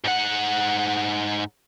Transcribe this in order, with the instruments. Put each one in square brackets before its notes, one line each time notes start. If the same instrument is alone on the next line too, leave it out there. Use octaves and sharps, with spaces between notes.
[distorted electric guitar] G#2 F#5